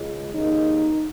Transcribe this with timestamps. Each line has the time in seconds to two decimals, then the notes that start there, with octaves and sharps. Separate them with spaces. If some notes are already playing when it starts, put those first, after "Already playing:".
Already playing: C#2 C#3 G#3
0.34 D#2 C#3 A#3 D#4